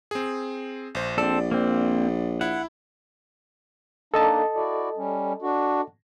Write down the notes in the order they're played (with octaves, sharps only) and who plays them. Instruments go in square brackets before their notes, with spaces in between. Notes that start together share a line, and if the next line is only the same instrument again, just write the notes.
[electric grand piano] C4 G#4
A#1 C5
[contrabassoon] A#1 [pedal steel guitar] C4 A4 [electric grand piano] D5
[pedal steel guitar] A#3 C4
[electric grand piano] E4 [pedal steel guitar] F#5
[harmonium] A#3 D4 D#4 [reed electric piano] A4 D#5 A5
[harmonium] E4 F#4 D5
G3 C#4
D4 F#4